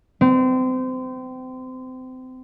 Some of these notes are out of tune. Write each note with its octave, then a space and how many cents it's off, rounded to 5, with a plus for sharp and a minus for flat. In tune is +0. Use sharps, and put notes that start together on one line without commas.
C4 -30